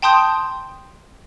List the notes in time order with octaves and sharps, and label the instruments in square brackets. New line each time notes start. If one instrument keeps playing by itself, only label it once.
[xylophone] G5 A5 C6 D#6 G6